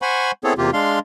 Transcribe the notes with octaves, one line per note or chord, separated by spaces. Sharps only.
C5 F#5 G#5 B5 C#6
B3 C4 E4 G#4 A4 C#5
E2 C3 A#3 F4 G4
G#3 D4 F5 C6